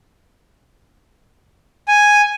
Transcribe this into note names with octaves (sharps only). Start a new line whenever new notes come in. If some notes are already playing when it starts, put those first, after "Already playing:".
G#5